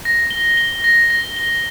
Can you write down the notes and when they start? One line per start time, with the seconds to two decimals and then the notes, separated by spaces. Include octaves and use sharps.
0.05 A#6
0.30 G7
0.57 G7
0.84 A#6
1.10 A#6
1.36 G7